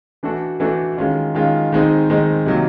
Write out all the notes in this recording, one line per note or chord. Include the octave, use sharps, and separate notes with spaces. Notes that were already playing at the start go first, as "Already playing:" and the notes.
E3 A3 D4 F#4 A4
E3 A3 D4 F#4 A4
D#3 G#3 C#4 F4
D#3 G#3 C#4 F4
D#3 G#3 C4 D#4
D#3 G#3 C4 D#4
C3 D#3 F#3 A#3